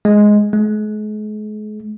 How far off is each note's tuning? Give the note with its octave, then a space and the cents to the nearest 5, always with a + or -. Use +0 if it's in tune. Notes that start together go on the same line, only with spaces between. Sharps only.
G#3 +5
G#3 +40